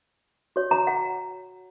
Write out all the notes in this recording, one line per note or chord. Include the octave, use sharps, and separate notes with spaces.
F#4 C#5
A#5
F#5